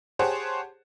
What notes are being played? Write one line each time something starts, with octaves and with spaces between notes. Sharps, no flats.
G4 G#4 C5 C#5 F#5 A5